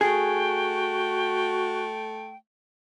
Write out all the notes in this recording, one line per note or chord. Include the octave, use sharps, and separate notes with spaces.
A3 F#4 G#4 G5